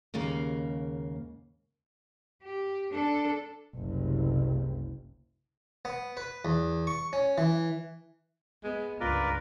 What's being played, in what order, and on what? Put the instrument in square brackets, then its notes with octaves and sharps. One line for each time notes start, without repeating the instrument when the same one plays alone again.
[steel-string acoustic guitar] D#2 G#2 C#3 A#3 F5
[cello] G4
D4 A4
[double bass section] F#1 C2
[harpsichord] B3
B4
E2
C#6
C#4
E3
[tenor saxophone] G#3 [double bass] B3
[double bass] C#2 G2 [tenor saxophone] F4 [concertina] A#4 B4 D5